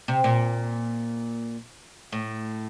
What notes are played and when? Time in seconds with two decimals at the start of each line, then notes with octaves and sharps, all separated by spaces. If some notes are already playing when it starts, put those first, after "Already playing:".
0.08 C3
0.24 A#2
2.12 A2